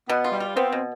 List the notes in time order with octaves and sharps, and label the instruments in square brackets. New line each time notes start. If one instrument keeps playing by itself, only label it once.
[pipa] B2 [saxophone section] B3
[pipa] F4
[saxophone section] G3
[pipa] F4
[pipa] B3 [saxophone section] C4
[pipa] B2